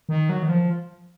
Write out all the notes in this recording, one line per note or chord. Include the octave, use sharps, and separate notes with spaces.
D#3
F#3
D#3
F3